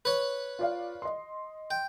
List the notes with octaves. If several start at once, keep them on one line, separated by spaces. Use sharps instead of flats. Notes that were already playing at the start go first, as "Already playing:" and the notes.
B4 C#5
F4 D5 F5
D#5 C6
G5